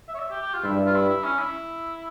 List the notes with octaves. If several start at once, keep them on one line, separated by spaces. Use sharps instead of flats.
E5
C#5
E5
G4
G4
F4
G2 E4
F4
E4
E4
C#4
E4